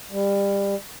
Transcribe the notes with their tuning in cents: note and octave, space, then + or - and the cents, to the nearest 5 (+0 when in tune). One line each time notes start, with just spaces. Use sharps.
G3 +25